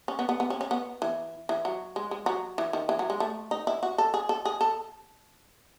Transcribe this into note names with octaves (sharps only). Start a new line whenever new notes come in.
C#4
B3
B3
B3
C#4
C#4
B3
E3
E3
F#3
G#3
G#3
F#3
E3
D#3
E3
F#3
G#3
A3
D#4
E4
F#4
A4
G#4
A4
G#4
A4